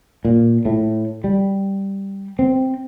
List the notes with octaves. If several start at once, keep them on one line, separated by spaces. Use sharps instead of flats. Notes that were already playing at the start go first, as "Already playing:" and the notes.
A#2
A2
G3
C4